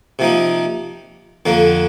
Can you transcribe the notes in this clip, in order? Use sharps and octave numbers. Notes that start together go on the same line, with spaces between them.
C3 F3 A#3 D#4
F2 D3 F3 A#3